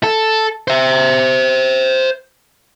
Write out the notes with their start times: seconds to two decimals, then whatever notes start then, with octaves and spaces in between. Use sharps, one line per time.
0.03 A4
0.68 C5 E5